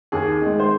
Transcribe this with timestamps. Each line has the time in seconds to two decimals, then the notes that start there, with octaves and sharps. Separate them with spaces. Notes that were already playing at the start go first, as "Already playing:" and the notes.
0.12 D#2 G#4
0.42 D#3 G#3
0.60 C5